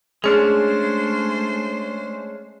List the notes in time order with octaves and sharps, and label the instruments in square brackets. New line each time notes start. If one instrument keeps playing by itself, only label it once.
[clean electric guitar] G#3 C#4 D4 [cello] A3 C5 [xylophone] G#4